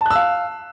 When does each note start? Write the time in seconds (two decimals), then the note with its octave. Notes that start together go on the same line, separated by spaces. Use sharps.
0.01 A5
0.06 F#6
0.11 E6
0.15 F5